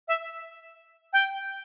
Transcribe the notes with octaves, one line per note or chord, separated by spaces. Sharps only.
E5
G5